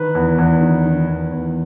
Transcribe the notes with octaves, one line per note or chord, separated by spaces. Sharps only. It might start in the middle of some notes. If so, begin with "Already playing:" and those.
Already playing: D#3 B4
E2
E2
D#3
D#3
E2
E2